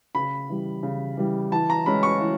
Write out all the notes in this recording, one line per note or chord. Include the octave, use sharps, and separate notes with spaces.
C#3 B5
E3 G3
C#3
E3 G3
E3 A5
A#5
G#3 C#4 B5
C#6
E3